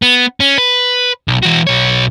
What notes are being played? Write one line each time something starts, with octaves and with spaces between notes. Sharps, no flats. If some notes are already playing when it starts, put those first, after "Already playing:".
B3
C#4
B4
B1
E3 F#4
B1 C#5